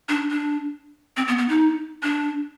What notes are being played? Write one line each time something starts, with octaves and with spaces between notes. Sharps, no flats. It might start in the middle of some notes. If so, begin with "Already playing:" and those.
D4
D4
C4
B3
B3
D#4
D4